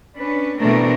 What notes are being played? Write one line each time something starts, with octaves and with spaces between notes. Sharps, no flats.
C#4 D4 B4
B2 E3 A3 C4 D4 A#4